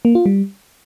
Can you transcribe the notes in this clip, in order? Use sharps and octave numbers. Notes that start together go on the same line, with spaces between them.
A#3
F4
G3